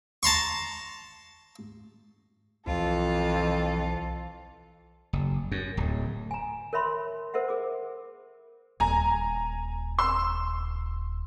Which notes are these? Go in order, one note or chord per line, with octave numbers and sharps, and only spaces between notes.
A5 A#5 C6 C#6
B1 F2 E3 F4 A4
F#1
F#2
D1
G#5 A#5
A#4 C#5 E5 B5 C6
A#4 C5 E5 F#5
G#4 D6
D#1 G#5 A#5
C6 E6